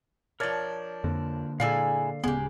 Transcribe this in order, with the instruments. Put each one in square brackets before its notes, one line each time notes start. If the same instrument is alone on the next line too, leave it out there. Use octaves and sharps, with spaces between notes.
[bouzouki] F3 D4 [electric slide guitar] A#4 C#5 D5
[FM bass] F2 [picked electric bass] D3 A#3
[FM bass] A#2 [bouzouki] G#3 E4 G#5 [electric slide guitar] A4 D5 F5
[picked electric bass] D1 C#3 [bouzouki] G#3 G4 [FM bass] B3